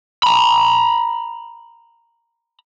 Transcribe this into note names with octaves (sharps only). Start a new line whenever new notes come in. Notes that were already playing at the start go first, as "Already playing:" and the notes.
A#5 B5